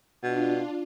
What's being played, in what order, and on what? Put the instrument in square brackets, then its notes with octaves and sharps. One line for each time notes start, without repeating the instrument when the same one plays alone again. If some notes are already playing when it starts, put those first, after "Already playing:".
[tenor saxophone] B2 [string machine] D4 F4